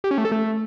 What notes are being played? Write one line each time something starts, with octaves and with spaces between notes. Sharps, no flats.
G4
C#4
A3
A4
A3